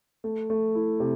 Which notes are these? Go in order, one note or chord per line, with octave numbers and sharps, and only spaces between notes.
A3
A3
E4
C3